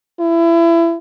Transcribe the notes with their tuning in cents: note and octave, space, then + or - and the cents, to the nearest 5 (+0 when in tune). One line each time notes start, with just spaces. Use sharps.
E4 +25